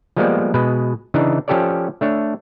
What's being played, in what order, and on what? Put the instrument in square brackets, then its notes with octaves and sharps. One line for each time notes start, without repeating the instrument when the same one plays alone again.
[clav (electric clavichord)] F3 G3 G#3 A#3 B3 D5
B2 G#3 B4
C#3 E3 D4 D#4
F3 C#4 G4 A4 C#5 D5
A3 D4 C#5